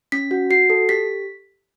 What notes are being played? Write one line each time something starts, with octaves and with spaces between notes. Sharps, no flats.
C#4 B6
F#4
F#4 C7
A4
G4 B6